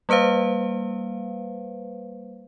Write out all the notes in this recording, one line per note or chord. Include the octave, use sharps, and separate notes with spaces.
G3 A#3 B4 C5 F5